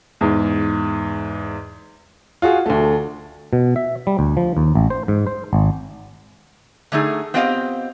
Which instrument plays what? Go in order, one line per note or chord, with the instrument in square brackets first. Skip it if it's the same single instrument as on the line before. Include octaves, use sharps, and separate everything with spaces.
[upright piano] E2 G#2
F4 F#4 G#4
D2 A3
[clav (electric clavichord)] B2
E5
G3
D2
F3
D#2
A1
C5
G#2
C5
G#1
[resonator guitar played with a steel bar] D3 A3 D#4 G#4
B3 C4 F4 G4 D#5 F5